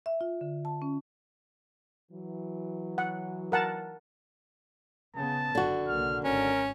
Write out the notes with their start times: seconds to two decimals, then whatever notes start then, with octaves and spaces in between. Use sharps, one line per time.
0.06 E5
0.21 F4
0.41 D3
0.65 A5
0.82 C#4
2.11 E3 F#3
2.98 F#5
3.52 A#4 F#5 A5
5.16 C#3 B3 A5
5.55 F#1 D3 F#4
5.88 B1 C#3 A#3 F6
6.24 G#1 C#4 A#4